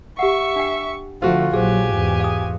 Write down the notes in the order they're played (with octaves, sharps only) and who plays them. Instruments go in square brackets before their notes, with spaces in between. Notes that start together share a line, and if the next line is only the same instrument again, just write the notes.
[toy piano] G4 F#5 [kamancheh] E5 C#6
[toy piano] D4 G5
[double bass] D3 F3 [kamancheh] A3 [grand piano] F4 F#4 [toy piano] C5
[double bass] A#1 F#3 [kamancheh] G4 G#5 [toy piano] G#4 C5
[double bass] E2 G#2
[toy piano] F5 D#6